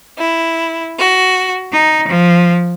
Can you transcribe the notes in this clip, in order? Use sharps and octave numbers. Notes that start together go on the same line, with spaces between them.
E4
F#4
D#4
F3